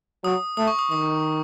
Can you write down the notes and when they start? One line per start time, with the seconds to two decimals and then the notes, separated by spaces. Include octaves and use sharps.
0.24 F#3 D#6
0.57 A3 D#6
0.67 C#6
0.79 D#6
0.91 D#3 D#6